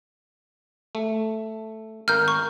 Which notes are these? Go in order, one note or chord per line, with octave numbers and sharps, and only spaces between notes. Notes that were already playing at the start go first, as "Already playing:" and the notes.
A3
G#1 A#4 F6 G6
C#6